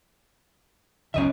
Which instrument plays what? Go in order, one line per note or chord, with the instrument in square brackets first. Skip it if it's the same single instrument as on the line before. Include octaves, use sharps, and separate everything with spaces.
[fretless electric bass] E1 C#2 F#2 [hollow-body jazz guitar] C#4 D#5 E5